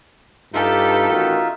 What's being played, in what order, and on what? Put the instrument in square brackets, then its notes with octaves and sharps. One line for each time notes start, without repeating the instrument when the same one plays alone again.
[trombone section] G2 [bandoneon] D#4 F4 E5 [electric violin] G4 A4
[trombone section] A1 D#3 F#4